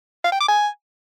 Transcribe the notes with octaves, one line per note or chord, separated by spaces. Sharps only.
F5
G5
D6
G#5